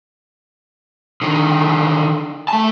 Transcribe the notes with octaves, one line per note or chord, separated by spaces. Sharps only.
D3 D#3
A3 A5